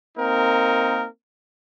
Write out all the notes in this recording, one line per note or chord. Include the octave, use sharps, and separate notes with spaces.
A#3 C4 D#4 A#4